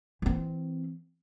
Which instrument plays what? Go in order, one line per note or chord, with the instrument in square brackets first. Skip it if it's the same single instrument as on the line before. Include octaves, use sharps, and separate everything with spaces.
[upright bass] E3 C4